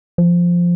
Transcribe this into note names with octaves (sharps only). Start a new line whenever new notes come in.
F3